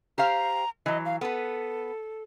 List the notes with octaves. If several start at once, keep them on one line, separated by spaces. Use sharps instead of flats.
G4 C5 F5 A#5
E3 F#3 D#5
F5
B3 A4 B4